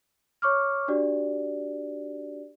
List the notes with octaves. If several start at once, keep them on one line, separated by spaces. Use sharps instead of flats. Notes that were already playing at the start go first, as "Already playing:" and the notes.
C#5 C#6 D6 F6
D4 F#4 G4 D5